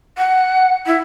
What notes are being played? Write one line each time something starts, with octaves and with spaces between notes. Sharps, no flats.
F#5
E4